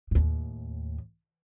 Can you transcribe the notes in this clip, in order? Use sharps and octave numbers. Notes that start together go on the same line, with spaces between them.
D#2 A2